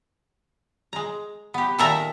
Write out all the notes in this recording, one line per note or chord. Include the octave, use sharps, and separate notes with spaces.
G#3 A#5
B3 G4
A#2 D#3 A4 A#4 E5 A#5